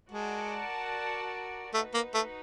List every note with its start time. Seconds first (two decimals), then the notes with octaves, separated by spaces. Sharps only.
0.11 G#3 F#4 A#4 D5 F#5 A5
1.74 A3 D#4 F#4 B4
1.94 A#3
2.14 A3